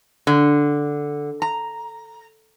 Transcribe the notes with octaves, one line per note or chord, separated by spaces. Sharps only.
D3
A#5